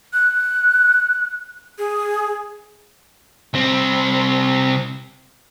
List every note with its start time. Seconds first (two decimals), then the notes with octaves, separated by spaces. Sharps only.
0.13 F#6
1.78 G#4
3.54 C2 C4